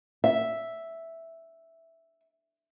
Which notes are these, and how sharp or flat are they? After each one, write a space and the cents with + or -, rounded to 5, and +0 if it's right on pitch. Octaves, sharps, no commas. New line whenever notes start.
E5 +0